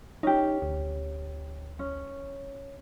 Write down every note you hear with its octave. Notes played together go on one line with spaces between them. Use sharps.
C#4 D#4 G4
D2
C#4